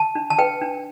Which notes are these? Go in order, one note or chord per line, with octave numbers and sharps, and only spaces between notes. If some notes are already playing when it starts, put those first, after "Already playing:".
Already playing: A5
D4
A5
B4 G5
D4